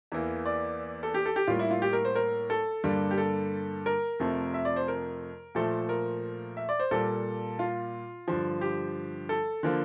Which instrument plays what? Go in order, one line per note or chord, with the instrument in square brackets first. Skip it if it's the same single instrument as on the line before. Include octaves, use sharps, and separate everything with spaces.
[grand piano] E2 E3 A#3
D5
A4
G4
A4
G4
A2 G3 A#3 F4
E4
F4
G4
A#4
C5
A#4
A4
G2 D3 G3 A#3
G4
A4
A#4
F2 C3 F3 A3
E5
D5
C5
A#4
A#2 F3 A3 A4
A#4
E5
D5
C5
A#2 G3 A#3 A4
F4
G2 D3 F3
G4
A4
D3 F3 A#3